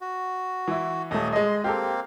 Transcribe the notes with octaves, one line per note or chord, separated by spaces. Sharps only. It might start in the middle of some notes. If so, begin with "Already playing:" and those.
F#4
E3 E4
D#1 A3 D#5 D#6
G#3 D#5 C6
A#3 C4 G4 A4 F5